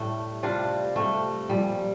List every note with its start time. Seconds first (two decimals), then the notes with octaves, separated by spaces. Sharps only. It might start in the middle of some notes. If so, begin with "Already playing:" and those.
Already playing: A2 G3 A3
0.43 C3 G3 D4 F4
0.96 C3 G3 A3
1.49 A#2 F3 G3